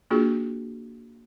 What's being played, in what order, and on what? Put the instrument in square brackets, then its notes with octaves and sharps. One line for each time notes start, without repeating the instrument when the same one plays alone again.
[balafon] A#3 D4 F4 F#4 G#4